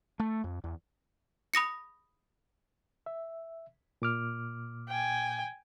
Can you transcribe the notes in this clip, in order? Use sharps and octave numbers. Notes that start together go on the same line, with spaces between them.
A3
F2
E2
B5 D#6 A#6 C#7
E5
A#2 D6 F6
G5 G#5